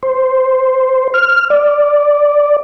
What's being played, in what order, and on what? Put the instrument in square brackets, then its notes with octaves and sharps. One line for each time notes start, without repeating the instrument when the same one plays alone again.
[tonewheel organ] C5
F6
D5